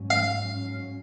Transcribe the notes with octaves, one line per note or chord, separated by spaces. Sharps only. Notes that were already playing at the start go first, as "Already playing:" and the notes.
Already playing: G#2 F#3 C#4
F5